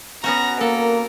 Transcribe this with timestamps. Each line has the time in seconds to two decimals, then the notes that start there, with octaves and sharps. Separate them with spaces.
0.24 B3 C#4 F#4 A#5
0.61 A#3 A4 A#4